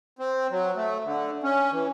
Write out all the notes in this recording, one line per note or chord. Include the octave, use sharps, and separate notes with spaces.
C4
F#3
A3
D3
C#4
E3